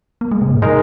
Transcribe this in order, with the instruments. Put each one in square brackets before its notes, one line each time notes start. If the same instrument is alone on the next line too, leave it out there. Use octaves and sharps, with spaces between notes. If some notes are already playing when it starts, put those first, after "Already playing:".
[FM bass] A#3
G#3
C3
G#2
[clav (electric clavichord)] G#3 D#4 A#4